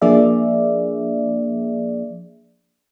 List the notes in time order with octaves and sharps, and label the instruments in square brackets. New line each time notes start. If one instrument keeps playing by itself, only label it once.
[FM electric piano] F3 A#3 D4 G#4 D5 E5